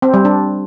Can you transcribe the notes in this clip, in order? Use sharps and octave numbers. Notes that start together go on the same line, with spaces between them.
C4
G3
D4